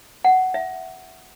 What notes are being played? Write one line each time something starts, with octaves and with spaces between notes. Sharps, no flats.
F#5
E5